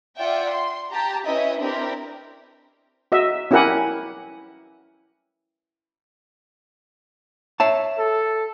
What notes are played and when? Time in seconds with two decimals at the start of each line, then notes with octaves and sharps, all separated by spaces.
0.16 F4 D5 E5 F#5 G5
0.48 C6
0.90 G4 A5 A#5
1.25 C#4 E4 B4 D#5 E5
1.59 C4 D4 E4 G4 A#4
3.12 F#4 D#5 E5
3.51 C#4 E4 G4 A#4 F#5 G#5
7.60 C#5 E5 A5
7.99 A4